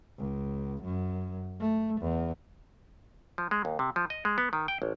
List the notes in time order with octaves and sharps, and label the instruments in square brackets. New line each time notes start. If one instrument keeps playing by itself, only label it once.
[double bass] C#2
F#2
A3
E2
[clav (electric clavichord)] F3
G#3
D#2
C3
F3
D#5
G#3
B3
D#3
G5
A1